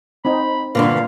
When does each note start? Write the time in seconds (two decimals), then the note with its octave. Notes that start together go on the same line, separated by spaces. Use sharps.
0.25 C4 D#4 B5
0.75 G2 A#2 D3 E3 F5